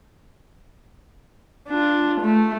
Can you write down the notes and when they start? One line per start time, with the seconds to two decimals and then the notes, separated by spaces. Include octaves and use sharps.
1.69 D4 F4
2.21 A3